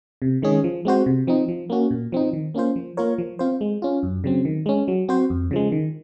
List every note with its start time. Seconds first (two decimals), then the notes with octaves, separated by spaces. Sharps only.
0.22 C3
0.42 D#3 G#3 C#4 G#4
0.64 F3
0.85 G#3 C4 F#4 C5
1.06 C3
1.27 F3 C4 D#4
1.48 F3
1.70 A#3 C#4 F#4
1.91 A#2
2.12 F3 C4 D#4
2.33 D#3
2.54 A#3 C#4 F4 C5
2.76 F3
2.97 A#3 F4 A#4 C#5
3.18 F3
3.39 C4 F4 C5
3.61 G#3
3.82 C#4 F4
4.03 F#2
4.24 C#3 F#3 C4
4.45 D#3
4.66 G#3 C#4
4.88 F#3
5.09 C4 F#4 C5
5.30 F2
5.51 C#3 F3 G#3
5.72 D#3